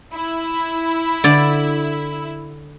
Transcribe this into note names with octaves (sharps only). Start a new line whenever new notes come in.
E4
D3 D5